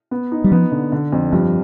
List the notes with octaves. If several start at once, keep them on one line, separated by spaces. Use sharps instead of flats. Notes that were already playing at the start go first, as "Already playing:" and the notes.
B3
D#4
G3
F3 B3
D3
D3
F2
G2 F3